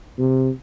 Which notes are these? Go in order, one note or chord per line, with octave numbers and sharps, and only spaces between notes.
C3